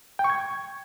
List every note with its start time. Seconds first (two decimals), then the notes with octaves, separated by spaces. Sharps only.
0.19 G5
0.24 C#6
0.30 G#6